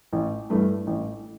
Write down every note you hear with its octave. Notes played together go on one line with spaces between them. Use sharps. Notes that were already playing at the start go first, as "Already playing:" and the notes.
A1
G2 E3 A3
A1